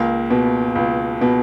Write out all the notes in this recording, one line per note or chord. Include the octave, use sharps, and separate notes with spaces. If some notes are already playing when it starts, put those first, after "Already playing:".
Already playing: C#2 A#3
B2
C#2
B2